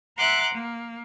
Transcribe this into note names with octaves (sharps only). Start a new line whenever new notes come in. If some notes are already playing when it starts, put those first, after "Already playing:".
E5 F#5 A#5 C6 D6 F#6
A#3